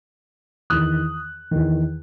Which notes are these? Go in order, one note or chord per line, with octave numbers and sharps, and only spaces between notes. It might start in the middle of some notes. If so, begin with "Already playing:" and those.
E2 D#3 D#6 F#6
E2 D#3